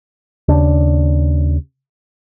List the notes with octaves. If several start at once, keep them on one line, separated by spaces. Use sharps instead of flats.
D#2 C#3 D4